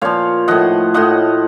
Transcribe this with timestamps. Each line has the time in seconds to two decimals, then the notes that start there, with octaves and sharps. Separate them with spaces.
0.01 A#2 F3 C#5 F5
0.48 A2 F3 D#5 F#5
0.94 A2 F3 D#5 F#5